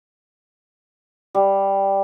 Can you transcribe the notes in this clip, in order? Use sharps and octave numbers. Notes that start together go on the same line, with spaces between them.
G3